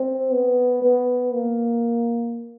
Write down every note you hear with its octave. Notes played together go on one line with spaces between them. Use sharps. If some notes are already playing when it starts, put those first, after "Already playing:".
Already playing: C4
B3
B3
A#3